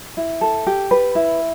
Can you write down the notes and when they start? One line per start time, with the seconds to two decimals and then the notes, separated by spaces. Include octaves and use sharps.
0.17 E4
0.41 A4
0.67 G4
0.91 B4
1.15 E4